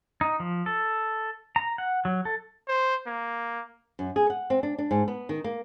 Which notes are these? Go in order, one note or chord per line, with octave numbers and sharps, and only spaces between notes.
D#4
F3
A4
A#5
F#5
F#3
A4
C5
A#3
F#2
G#4
F#5
C4
D4
D4
G#2
B3
D#3
A#3